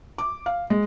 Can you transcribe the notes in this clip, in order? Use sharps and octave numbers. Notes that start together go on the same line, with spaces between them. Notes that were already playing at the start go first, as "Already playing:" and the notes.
D6
F5
G#3